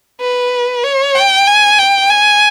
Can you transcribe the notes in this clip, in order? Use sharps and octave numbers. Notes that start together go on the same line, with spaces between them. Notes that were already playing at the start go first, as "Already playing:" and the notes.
B4
C#5
G5
G#5
G5
G#5